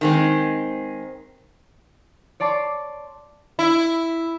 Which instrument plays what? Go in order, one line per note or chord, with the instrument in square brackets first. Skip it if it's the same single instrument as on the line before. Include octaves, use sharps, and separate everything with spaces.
[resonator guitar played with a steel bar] D#3 G#3 C4
[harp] C#5 D5 A5 C6 D6
[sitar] E4